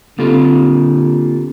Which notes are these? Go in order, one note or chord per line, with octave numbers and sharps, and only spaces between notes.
D3 A#3 C4 F4 G4 A4